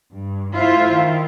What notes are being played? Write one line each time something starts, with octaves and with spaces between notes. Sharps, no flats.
G2
A3 E4 F4 C5 E5 F5
D#3